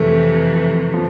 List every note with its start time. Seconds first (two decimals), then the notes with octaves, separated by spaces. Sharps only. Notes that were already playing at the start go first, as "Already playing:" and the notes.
Already playing: F2 C3 E3 A3
0.94 F3